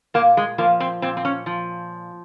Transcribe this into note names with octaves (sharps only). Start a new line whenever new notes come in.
A#2 A#3
G#3
F3 A#3
C4
A#2 C4
C4
C#4
F3